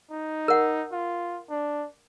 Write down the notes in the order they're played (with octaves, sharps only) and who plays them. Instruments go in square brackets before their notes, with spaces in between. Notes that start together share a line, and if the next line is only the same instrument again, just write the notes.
[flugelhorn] D#4
[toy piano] A#4 F#5
[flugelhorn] F4
D4